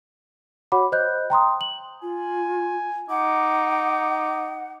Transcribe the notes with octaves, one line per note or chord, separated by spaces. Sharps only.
F#4 C#5 F#5 B5 D6
C5 D#5 F#6 G6
G5 A#5 C6 D#6
F#7
F4 G#5
D#4 F#5 D6